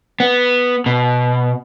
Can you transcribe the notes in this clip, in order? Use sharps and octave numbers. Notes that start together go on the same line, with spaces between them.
B3
B2